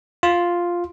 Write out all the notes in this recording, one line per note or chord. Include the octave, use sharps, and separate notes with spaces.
F4